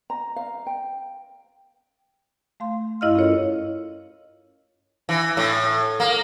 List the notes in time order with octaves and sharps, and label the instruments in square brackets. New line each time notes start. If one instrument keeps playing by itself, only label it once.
[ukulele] A#5
F5
G5
[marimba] A3 F5 C6
G2 E4 D#5 F5 F6
C#4 F4 A4 A#4 C#5
[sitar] E3
A2
A#3